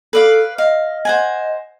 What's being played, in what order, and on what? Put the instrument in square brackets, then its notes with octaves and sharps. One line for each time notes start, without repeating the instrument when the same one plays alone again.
[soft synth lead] A4 [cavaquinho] B4 D5 F5
[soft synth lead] D#5 [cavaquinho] F5
[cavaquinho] C5 F#5 G#5